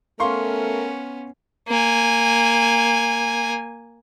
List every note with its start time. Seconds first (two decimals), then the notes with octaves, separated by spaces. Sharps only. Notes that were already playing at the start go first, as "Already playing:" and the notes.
0.20 A3 B3 C#4 A#4 F5 C6 C#6
1.68 A#3 G#5